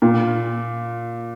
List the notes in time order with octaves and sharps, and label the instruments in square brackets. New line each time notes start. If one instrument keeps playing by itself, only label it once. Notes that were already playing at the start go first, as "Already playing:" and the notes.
[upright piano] A#2